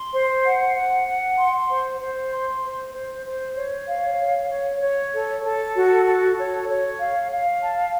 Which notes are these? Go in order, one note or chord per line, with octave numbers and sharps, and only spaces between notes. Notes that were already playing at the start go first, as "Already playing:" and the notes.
Already playing: C6
C5
F#5
F#5
F#5
C6
C5
C5
C6
C5
C5
C5
C#5
F5
C#5
C#5
C#5
A4
A4
F#4
A4
C#5
C#5
F5
F5
A5